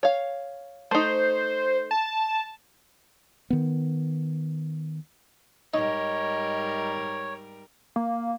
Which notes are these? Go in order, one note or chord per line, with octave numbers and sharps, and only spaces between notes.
C#5 F5
A3 D#4 C5
A5
D#3 B3
G#2 G3 D#4 A#4 C#5 D#5
A#3